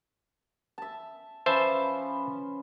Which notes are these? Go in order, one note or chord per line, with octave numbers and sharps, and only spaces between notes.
E5 A5
F3 C#4 B4 C5 E5 A5